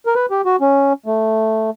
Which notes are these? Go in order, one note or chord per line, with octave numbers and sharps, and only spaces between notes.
A#4
B4
G4
F#4
C#4
A3